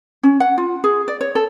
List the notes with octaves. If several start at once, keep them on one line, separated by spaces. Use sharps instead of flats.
C#4
F#5
F4
G#4
D5
C#5
A4